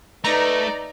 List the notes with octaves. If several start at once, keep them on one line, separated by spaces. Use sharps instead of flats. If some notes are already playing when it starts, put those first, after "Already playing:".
A3 D#4 B4 D5 A#5